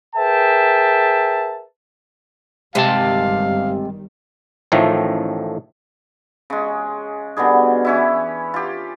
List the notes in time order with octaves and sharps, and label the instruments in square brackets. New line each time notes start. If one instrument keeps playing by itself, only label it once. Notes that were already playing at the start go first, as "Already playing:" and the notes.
[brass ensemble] G#4 A#4 B4 E5 G5 A5
[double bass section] G1 D#3 G3 [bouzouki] C3 [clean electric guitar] G#3 C4 A5 [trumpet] F5
[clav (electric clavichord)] A1 A2 D#3 F3 A3
[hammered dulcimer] C#3 G#3
B2 D3 G3 G#4
E3 C#4 E4
F4 G4